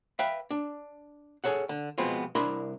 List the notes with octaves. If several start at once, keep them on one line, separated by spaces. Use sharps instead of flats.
B4 E5 F5 G5 B5
D4
G#4 A4 C#5 F#5
D3
B2 F3 G#3 B3 C4 F4
C2 D4 E4 A#4 B5 C6